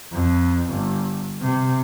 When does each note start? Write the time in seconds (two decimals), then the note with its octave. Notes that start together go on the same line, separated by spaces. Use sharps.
0.13 F2
0.69 G1
1.40 C3